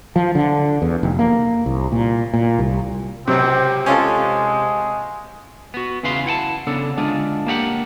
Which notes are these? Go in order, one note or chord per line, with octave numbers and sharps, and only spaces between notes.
F3
D3
E2
F1
A#3
C2
A#2
A#2
C2
C#2 C3 F#3 C4
G#3 C#4 F4 A4
B3 F#4
E2 C#3 E3 B4 F5 C6
E4 F#5 G5 A5
C#3 B3 D4 A4
D3 G#3 D4 F4
A#3 D4 G4 F5 F#5